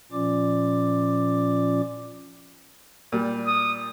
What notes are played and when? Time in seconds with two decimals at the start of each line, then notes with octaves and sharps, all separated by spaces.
0.12 A#2 F3 C#4 F4 D5 D6
3.12 A#2 G3
3.47 D#6